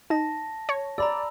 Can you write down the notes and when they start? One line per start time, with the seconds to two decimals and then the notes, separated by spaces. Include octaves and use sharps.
0.10 D#4 A5 A#6
0.69 C#5
0.98 D5 A#5 B5 E6